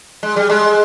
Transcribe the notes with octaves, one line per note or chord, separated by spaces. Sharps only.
G#3
G3
G#3